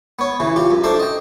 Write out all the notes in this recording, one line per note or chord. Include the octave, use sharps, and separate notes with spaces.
B3 C#5
C#3 E3
F4 G4
F#2
D4 A4 C5 D5 E5
D#5 G5